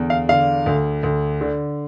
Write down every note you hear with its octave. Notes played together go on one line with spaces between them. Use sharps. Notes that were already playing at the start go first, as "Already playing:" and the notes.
Already playing: E2 D3
F5
D3 F5
D2
D2
D3